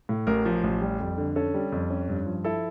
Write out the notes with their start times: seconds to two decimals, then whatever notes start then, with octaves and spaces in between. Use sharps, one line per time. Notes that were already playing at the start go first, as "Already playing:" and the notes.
0.09 A2
0.27 A1 A#4
0.45 F3
0.64 A1
0.81 G3
1.00 F2
1.18 D3
1.36 C#4 A4
1.54 G3
1.72 F2
1.90 C#4
2.08 G2
2.27 F3
2.44 E4 A4